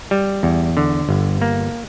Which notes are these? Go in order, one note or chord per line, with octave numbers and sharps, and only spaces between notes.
G3
E2
D3
G1
A#3